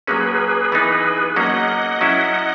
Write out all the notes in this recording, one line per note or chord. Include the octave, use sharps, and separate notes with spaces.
F#3 A#3 C#4 G#4 B4
E3 B3 D#4
F#3 A#3 C#4 D#5 F#5
F#3 C#4 E4